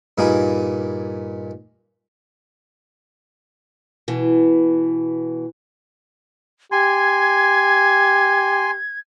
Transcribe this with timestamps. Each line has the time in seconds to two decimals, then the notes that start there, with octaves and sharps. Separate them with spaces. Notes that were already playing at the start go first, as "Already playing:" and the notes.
0.18 G2 A#2 A#3 D#4 G#4 B5
4.08 B2 E3
6.72 G4 G#5 C6 G#6